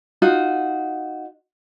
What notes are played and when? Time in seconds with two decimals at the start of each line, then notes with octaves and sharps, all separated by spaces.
0.22 D#4 F4 F#4